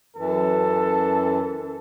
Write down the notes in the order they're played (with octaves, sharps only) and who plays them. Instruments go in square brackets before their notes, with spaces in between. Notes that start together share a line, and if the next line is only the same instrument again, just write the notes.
[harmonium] F#2 E3 [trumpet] A4